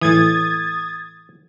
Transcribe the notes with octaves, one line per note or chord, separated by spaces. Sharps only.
A2 E3 D#6 G#6 A6